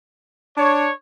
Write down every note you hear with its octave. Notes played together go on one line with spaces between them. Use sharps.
D4 C#5